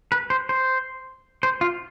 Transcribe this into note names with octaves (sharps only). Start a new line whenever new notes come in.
B4
C5
C5
C5
F4